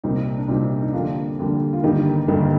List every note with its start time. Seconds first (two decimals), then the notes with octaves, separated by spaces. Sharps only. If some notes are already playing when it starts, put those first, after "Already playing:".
0.04 C2 A#2 G3 C4 D#4
0.38 D4
0.48 C2 A#2 G3 C4 D#4
0.82 D#4
0.93 F2 D3 G3 A#3 D4 F4
1.39 F2 D3 G3 A#3
1.73 F4
1.83 G1 G2 D#3 G3 A#3 D#4 G4
2.28 G1 G2 D#3 G3 A#3